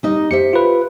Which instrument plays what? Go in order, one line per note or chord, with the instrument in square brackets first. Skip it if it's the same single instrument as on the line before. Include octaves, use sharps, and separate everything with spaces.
[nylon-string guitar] G3 D#4 D#5
[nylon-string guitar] G4 C5 E5 [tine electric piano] C#7
[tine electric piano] F4 B4